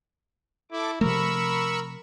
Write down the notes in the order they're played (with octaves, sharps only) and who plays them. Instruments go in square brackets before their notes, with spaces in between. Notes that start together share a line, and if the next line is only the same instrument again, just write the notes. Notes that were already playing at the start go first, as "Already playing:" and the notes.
[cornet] E4 [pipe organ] A4 D6
[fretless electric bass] C3 F3 A3 [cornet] A#4 [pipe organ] B5 C#6 E6